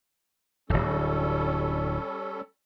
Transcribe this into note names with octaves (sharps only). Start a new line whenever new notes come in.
D1 G#1 G3 C#4 A4